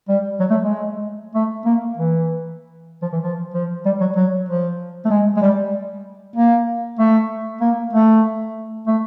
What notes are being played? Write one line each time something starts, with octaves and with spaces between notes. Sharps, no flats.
G3
F#3
A3
G#3
A3
A#3
E3
F3
E3
F3
F3
G3
F#3
F#3
F3
A3
G#3
G#3
G3
A#3
A3
A#3
A3
A3